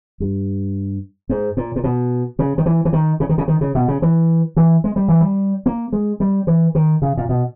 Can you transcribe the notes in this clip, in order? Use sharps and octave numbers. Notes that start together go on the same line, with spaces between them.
G2
G#2
A#2
A#2
B2
C#3
D#3
E3
E3
D#3
C#3
D#3
C#3
D#3
C#3
B2
C#3
E3
E3
G#3
G3
E3
G3
A#3
G#3
G3
E3
D#3
C#3
A#2
B2